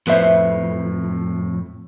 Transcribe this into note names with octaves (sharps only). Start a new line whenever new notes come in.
F2 A2 B4 C5 E5